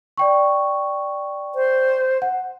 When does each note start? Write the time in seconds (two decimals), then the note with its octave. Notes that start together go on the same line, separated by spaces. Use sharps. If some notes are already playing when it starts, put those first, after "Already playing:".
0.18 D5 G5 C#6
1.55 C5
2.22 F#5